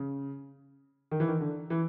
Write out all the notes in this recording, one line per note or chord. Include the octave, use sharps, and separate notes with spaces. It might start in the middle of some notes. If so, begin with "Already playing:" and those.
Already playing: C#3
D#3
E3
D#3
D3
E3